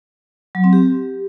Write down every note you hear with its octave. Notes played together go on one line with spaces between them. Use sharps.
F#3
C4
G4